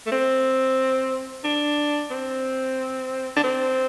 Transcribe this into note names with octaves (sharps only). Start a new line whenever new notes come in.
A3
C4
D4
C4
D4
C4